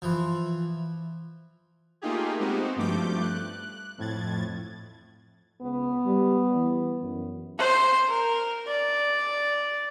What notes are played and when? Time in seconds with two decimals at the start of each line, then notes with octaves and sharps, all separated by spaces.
0.02 E3 F3
2.02 A3 A#3 D#4 F4 G4 G#4
2.40 G#3 B3 C4 D#4 F#4 G4
2.76 G2 F3 A3 D6 G6
3.21 F#6
3.98 F2 A2 G#6 A6
5.62 C#2 B3
6.05 G3
6.54 E3
7.02 F#2
7.59 C5
8.09 A#4
8.67 D5